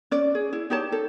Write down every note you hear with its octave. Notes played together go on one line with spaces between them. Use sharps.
C#4 D5
G#4
E4
D#4 G4 C#5 A5
A4